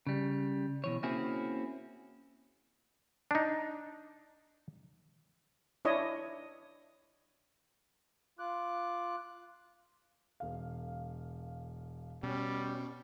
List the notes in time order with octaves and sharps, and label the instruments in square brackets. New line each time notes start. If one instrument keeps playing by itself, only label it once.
[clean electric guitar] C#3 G3
B2 E3 C#5
A#3 C4 C#4 E4 F#4 G#4
[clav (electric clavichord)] D4 D#4
[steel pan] D4 E4 C#5 D#5
[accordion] F4 D6 F#6
[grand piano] E1 F5
[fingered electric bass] B2 [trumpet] G3 [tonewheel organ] C#4